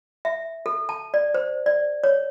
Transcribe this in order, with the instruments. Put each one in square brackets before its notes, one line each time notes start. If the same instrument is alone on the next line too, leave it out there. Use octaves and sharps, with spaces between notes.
[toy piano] E5
A4
A5
D5
C5
D5
C#5